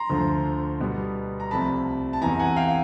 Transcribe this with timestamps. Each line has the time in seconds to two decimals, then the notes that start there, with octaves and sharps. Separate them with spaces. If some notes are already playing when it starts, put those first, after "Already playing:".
Already playing: A#5 C6
0.09 D2 D3 F3
0.80 B2 G3 B3
1.40 A#5
1.51 C2 C3 F3 A3 A5 B5
2.13 A5
2.21 E2 C3 E3 G#5 A#5
2.39 F#5 G#5
2.56 F5 G5